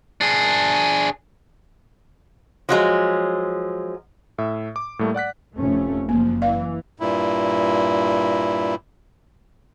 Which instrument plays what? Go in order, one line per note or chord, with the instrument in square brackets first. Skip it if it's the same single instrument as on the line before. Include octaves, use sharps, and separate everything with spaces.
[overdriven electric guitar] D4 G#4
[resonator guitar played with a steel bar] F3 F#3 G#3
[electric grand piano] A2 E5
D6
A2 G3 A3 A#3
D5 F#5 F#6 B6
[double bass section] F1 A3 C#4
[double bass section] F#1 F3 [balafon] A#3
[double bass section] E3 [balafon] D5 F5
[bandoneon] G2 A#2 E4